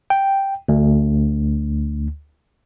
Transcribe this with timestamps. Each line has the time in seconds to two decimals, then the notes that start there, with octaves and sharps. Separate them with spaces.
0.10 G5
0.69 D2